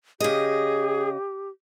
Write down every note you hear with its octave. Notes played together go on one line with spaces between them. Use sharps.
C#3 G4 G#4 D#5